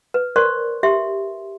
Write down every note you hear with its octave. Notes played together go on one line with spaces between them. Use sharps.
B4
A#4 C5 D5 C6 C#6
G4 E5 C6